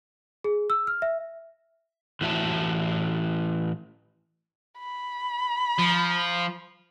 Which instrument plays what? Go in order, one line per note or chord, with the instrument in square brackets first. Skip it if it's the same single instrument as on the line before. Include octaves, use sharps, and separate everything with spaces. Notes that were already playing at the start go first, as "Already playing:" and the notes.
[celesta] G#4
E6
F6
E5
[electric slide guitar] A2 E3 F#4 E5 G5 A5
[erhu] B5
[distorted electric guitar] F3